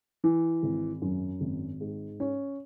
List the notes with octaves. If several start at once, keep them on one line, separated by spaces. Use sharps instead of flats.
E3
G#1
F#2
G#1
G#2
C#4